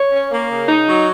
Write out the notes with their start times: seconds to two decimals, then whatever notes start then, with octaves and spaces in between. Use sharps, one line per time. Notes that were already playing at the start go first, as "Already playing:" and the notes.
Already playing: C#5
0.12 C#4
0.31 A#3
0.50 C#3
0.68 D#4
0.88 F#3